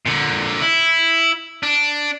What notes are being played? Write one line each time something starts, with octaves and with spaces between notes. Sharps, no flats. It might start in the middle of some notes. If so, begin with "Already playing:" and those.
A#2 D3
E4
D4